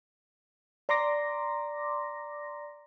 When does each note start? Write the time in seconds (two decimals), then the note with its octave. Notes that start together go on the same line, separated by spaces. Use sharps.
0.89 D5 A#5 C6 D6 A#6